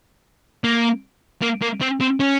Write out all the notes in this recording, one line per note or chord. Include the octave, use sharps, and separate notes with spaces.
A#3
A#3
A#3
C4
C4
C#4